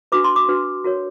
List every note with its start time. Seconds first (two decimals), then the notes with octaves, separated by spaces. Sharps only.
0.12 D4 F#4 B4 D6
0.24 C6
0.36 D6
0.48 D4 F#4 B4
0.84 F#4 A#4 C#5